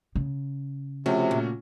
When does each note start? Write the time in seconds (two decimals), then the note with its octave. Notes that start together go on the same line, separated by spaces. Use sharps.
0.16 C#3
1.06 C3 F3 A3 C#4 F#4
1.31 A#2